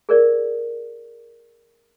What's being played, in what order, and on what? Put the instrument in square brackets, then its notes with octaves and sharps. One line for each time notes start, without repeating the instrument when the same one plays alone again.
[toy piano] G#4 A#4 D5